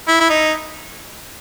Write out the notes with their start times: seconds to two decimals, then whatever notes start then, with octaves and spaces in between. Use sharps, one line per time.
0.08 E4
0.20 E4
0.30 D#4